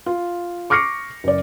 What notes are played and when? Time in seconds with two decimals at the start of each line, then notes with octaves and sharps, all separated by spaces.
0.06 F4
0.70 C#6 D6 F6 A#6 C7 C#7
1.24 F#1 D5